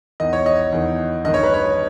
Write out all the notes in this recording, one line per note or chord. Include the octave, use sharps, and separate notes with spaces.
E2 D#3 D#5
C#5
D#5
E2 D#3
G2 D#3 D#5
C#5
B4
C#5